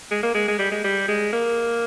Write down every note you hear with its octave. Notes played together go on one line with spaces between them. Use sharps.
G#3
A#3
G#3
G#3
G3
G#3
G3
G#3
A#3